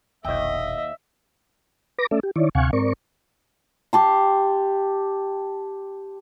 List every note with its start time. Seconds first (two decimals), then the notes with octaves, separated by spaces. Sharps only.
0.25 E1 A#1 D#2 D#5 E5 G5
1.98 B4 D6 A#6
2.11 A3 C#4 A4 D5 E5
2.23 G4
2.36 D#3 E4 C#5 D5
2.55 D2 C3 F5 F#5 G#5 C#6
2.73 G#2 C4 A#4 D5 C#6
3.93 G4 A5 C6